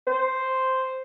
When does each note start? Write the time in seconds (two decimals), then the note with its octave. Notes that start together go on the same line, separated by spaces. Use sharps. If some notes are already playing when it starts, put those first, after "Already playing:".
0.07 C5